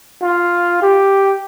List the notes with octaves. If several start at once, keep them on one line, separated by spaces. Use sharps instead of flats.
F4
G4